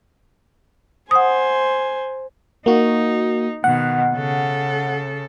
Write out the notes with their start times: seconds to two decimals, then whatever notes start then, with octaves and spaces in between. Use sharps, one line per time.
1.11 C5 F#5 G#5 D#6
2.66 A#3 D#4 F#4
3.64 B2 D#3 F#5
4.14 C#3 A4